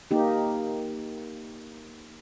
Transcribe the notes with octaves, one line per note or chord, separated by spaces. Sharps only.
A#3 D#4 G4